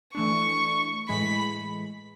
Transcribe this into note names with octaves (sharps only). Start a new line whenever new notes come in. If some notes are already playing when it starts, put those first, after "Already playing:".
E3 A3 D4 C#6
A2 E3 G#3 B5